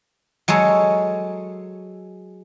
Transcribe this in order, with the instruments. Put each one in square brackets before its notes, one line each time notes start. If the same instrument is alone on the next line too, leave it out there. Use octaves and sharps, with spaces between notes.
[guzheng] F#3 G#3 A4 C#5